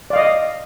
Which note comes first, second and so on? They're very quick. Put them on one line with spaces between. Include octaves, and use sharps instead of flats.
D5 F5 D#5